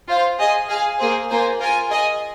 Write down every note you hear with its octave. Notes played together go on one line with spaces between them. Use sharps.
F4 C5 F5
G#4 D#5 G#5
G#4 F5 G#5
A#3 G#4 C5
A#3 F4 C5 G#5
F4 A#4 G#5
G#4 D#5 G#5